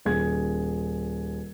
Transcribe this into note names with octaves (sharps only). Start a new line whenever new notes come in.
D#1 G#4 G#6